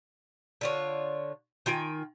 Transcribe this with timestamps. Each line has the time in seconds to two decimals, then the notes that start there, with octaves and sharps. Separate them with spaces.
0.61 D3 F4 C#5
1.66 D#3 F4 G5 G#5